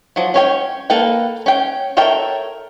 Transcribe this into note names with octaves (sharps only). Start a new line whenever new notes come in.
F3 F#3
C#4 C#5 G5
A#3 A4 B4 G5
C#4 G5
A4 A#4 C#5 E5 G5